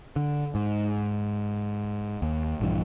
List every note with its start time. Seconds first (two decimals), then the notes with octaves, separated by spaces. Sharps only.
0.16 D3
0.55 G#2
2.22 D#2
2.60 A#1 G2 E3